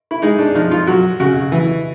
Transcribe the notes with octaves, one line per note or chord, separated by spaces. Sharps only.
E4
G#3 D#4
D4
F3 D#4
F4
F#3 F#4
C#3 F#4
E3